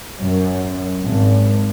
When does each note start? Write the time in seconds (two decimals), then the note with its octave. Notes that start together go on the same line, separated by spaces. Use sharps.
0.23 F#2
1.06 G#1